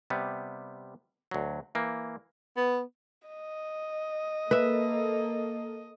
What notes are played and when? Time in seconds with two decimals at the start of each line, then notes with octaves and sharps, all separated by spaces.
0.10 C3 G3 B3
1.31 D2 F#3
1.75 E3 A#3
2.57 B3
3.27 D#5
4.51 A#3 A4 B4 E5